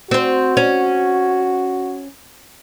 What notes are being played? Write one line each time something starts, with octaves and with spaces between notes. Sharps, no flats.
C4 F#4 C5
C#4